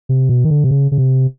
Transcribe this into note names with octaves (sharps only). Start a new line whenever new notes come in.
C3
B2
D#3
D3
C3
C#3
C#3
C3